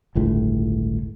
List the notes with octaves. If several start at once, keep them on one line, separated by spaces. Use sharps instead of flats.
G1 C#2 A2